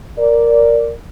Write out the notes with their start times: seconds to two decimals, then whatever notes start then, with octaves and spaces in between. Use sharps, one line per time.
0.18 A#4 D5